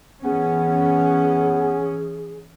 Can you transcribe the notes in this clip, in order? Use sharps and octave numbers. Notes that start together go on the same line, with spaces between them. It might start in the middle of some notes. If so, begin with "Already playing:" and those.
E3 B3 C#4 G#4